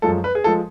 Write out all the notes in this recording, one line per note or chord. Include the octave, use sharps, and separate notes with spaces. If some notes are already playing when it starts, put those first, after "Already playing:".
F#2 F3 G#3 A4
B4
G#4
F3 G#3 A4